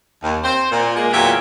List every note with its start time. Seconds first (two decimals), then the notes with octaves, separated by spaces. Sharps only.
0.23 D#2
0.44 C4 C5
0.72 A#2
0.96 G#3 A#3
1.13 E2 A#2 F#3 G4 E5